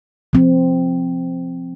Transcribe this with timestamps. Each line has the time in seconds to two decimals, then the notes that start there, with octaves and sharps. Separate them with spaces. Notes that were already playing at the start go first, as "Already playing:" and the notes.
0.33 F3 C4